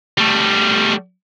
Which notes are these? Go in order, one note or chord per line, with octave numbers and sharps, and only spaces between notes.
G3 A3